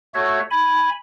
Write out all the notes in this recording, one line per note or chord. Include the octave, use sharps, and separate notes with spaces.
A3 F#4 C#5 E5
G#5 B5